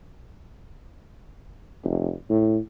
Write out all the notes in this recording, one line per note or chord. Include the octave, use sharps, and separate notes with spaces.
F1
A2